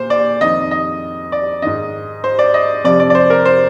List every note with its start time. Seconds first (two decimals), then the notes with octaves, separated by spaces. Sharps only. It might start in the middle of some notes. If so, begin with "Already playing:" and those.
Already playing: A#2 C5
0.10 D5
0.41 F2 D#3 D#5
0.71 D#5
1.32 D5
1.62 G#2 D#3 D#5
2.24 C5
2.39 D5
2.54 D#5
2.84 F2 C3 F3 D5
3.00 D5
3.10 D5
3.15 C5
3.30 A#4
3.45 C5